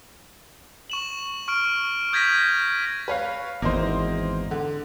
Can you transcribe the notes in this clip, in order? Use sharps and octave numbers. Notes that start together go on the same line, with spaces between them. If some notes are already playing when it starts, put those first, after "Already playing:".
C#6 E7 F#7
C#6 F6 D7
D#6 G6 G#6 A#6 B6 D#7
B4 C#5 F5
G#1 E2 A#3 D#4 C5
D3